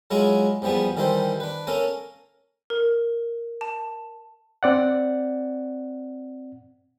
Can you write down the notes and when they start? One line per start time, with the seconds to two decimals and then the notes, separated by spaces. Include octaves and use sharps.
0.11 F#3 G#3 E4 F4 G#4
0.62 E2 F3 G3 B3 G#4
0.97 D#3 E3 G3 A4 C5
1.40 D4 B4
1.67 A#3 C#4 A4 A#4
2.70 A#4
3.61 A5
4.63 C4 D5 F#5